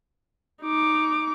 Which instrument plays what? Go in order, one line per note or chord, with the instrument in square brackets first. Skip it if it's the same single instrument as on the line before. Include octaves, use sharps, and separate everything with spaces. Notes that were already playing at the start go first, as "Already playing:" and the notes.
[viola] D#4 D6